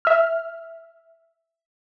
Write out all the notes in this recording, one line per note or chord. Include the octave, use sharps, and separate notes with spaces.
E5 F6